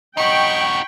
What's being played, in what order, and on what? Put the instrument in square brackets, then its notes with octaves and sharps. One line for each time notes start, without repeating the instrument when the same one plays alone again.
[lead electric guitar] D#4 F#4 [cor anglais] D#5 [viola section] G5 [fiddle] B5 C#6